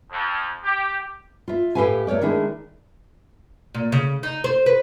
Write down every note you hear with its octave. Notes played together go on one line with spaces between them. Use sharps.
F2
G4
F4 E5
A2 G4 A4 B4 F5 G#5
A3 A#4 C#5 D5
D#3 G#3 A3 D4 E4 G#4
A#2
C#3
D#4
C5
B4